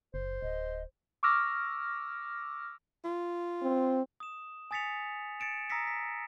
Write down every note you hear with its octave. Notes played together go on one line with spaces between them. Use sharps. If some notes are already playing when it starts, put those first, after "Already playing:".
F#1 C5
D1 D#5
C#6 D6 E6 F6 A#6
F4
C4
D#6 E7
G#5 D#6 A6 B6 C#7 F7
A6 C#7 D7 E7
A#5 D#6 E6 A#6 B6 C#7
B6